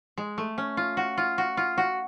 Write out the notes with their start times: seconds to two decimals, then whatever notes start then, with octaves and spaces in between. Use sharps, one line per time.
0.17 G#3
0.38 A3
0.58 C#4
0.77 F4
0.97 F#4
1.18 F4
1.38 F#4
1.57 F4
1.78 F#4